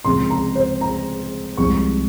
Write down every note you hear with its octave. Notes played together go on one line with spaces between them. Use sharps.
C#2 C3 F3 C6
A#5
C5
A#5
C2 C3 F3 G#3 C#6